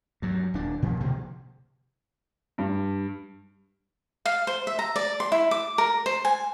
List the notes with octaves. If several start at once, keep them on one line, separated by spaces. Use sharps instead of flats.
G2 F#3
D#1 D4
A#2 F3
B2 D3 F3 A#3
G2
F5
C5
E5
A#5
D5
C6
E4
D6
A#4
C5
G#5